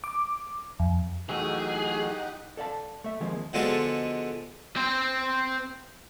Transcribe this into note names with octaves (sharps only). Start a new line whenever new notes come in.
D6
F2
E3 F#3 A3 D#4 G4 G#4 F#5
A4 D5 F5 A5
A3 E5
D#3 F3 G#3 A#3 C4
D3 F3 G#3 B3 F#4 A4
C4 C5